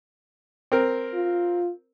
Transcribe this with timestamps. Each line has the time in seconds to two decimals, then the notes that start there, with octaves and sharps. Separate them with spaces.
0.72 C4 A#4
1.13 F4